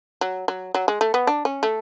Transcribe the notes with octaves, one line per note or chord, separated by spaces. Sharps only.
F#3
F#3
F#3
G#3
A3
B3
D4
C#4
A3